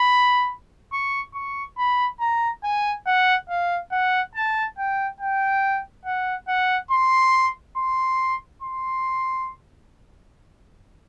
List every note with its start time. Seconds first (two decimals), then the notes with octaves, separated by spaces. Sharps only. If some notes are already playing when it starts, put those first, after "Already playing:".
Already playing: B5
0.93 C#6
1.34 C#6
1.78 B5
2.20 A#5
2.64 G#5
3.06 F#5
3.49 F5
3.92 F#5
4.35 A5
4.78 G5
5.20 G5
6.05 F#5
6.48 F#5
6.91 C6
7.77 C6
8.62 C6